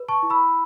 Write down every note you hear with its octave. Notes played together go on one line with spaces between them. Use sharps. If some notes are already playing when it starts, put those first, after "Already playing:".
Already playing: B4
A5 C#6
E4
B5 E6